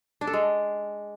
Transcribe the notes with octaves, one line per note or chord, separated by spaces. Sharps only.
D4
A4
G#3